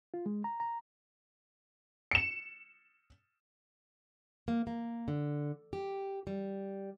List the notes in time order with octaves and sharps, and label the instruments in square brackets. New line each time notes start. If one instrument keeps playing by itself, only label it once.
[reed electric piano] F4
G#3
A#5
A#5
[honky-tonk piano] C#7 E7
[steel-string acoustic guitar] A#3
A#3
D3
G4
G3